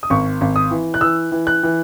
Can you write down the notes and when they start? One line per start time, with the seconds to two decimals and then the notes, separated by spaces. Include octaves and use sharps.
0.03 D#6
0.10 G#1 C#6
0.41 G#1
0.56 D#6
0.71 E3
0.94 F#6
1.01 E3 E6
1.32 E3
1.47 F#6
1.63 E3